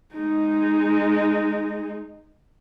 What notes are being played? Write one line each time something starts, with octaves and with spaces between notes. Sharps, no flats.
G#3 D#4